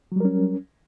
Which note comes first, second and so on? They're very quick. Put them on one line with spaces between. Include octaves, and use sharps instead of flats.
F#3 G3 A#4 C#4